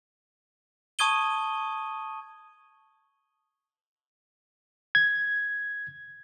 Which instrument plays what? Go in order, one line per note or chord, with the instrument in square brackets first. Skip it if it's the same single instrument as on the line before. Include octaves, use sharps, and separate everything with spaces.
[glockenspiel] A5 C#6 D#6 G#6 D#7 G7
[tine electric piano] G#6